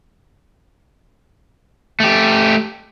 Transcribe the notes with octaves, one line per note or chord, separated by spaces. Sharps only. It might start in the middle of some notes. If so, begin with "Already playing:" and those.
A3 G4